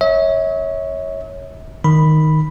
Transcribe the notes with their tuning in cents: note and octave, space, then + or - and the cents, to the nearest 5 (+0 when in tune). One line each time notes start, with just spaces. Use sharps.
C#5 +0 E5 -40
D#3 +0 B5 +0